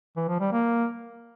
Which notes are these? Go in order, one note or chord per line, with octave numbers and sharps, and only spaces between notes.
E3
F3
G3
A#3